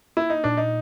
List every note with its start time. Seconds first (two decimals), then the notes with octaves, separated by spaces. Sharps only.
0.17 A#3 E4
0.30 D#4
0.44 A#2 D4
0.57 D#4